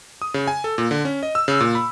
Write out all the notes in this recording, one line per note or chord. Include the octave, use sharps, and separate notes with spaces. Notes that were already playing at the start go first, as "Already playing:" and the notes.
D#6
C#3
G#5
A4
A#2
D3
C#4
D#5
E6
C#3
A#2
B5